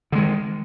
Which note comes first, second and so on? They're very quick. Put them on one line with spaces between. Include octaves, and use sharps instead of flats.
D3 G#3 D#3